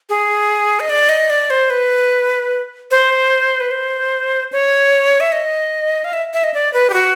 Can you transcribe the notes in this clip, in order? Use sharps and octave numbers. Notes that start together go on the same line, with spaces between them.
G#4
D#5
D5
D#5
D5
C5
B4
C5
B4
C5
C#5
E5
D#5
F5
E5
E5
D#5
D5
B4
G4
F#4